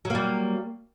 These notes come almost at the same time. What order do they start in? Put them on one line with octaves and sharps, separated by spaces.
F#3 A#3 G3